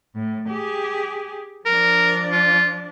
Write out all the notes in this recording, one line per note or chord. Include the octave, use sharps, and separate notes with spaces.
A2
G4 G#4
F3 D4 A#4
F4